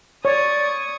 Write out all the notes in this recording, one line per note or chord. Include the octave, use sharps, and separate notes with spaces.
C#5 D5 C#6 D#6 G#6